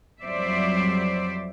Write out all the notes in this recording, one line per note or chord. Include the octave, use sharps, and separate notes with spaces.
F2 F#3 G3 C5 D5 E5